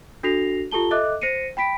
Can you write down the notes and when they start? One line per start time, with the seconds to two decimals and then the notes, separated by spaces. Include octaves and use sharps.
0.23 D4 F#4 A4 A#6 C7 F7
0.71 F4 G4 A4 A5 G7
0.91 A4 D#5 E5 D6 F#6
1.22 C5 A#6 C7 C#7 D#7
1.57 G5 B5 B6 D7